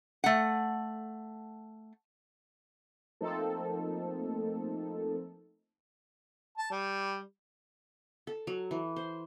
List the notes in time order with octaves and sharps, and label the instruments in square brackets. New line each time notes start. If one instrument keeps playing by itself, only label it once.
[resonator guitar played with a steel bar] A3 F#5
[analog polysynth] F3 A3 A#3 C4 D#4 A4
[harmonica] A5
G3
[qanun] A4
F#3
E3
C5